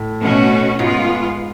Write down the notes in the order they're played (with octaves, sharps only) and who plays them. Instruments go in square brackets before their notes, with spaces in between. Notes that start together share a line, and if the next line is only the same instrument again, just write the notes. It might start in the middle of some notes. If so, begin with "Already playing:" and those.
Already playing: [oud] A2
[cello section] B2 A3 C#4 F#4
[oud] G#2 [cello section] G#3 B3 F4